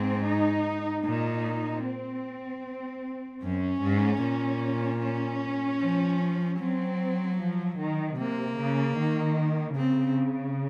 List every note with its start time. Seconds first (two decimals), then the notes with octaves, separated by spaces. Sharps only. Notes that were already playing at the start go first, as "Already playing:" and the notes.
Already playing: G#2 C4
0.25 D#4
1.05 A#2 D#4
1.83 C4
3.42 F#2 C#4
3.82 G#2
4.22 A#2
5.01 C#4
5.80 F3
6.59 F#3 C4
7.39 F3
7.79 D#3
8.18 C3 A#3
8.58 C#3
8.98 D#3
9.76 C#3 C4